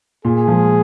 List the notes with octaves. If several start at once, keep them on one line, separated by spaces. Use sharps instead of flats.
A#2 G#4
F3 G#3